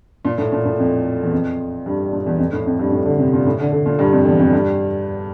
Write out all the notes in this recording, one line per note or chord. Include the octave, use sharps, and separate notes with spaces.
A#2
A2
A#2
A2
F2
E2
F2
G2
A#2
E2
F2
A2
F2
G2
A2
D3
C3
A#2
A2
D3
D3
A#2
G2
F2
E2
F2
G2